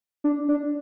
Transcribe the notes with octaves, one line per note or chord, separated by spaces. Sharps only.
D4
D4